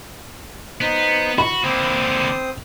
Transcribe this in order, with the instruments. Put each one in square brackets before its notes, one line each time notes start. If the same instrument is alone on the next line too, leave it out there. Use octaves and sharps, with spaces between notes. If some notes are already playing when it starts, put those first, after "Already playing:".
[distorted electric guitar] B3 [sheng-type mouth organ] D#4 C5
[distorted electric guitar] F#4 [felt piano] B5
[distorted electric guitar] D3 A#3 [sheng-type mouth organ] C4 C5 D#6